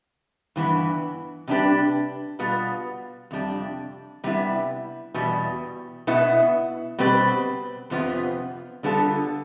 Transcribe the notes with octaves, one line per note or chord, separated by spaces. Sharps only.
G2 E3 B3
C3 G3 D4 G4 B4
B2 G3 B3 F4
F2 C3 G3 D4
C3 G3 B3 E4
E2 B2 G3
B2 B3 E4
B2 G3 C4 G4 B4
F2 C3 F3 B3
D3 G3 B3 F4 A4